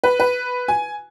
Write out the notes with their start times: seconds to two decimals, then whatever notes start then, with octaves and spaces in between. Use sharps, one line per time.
0.04 B4
0.20 B4
0.68 G#5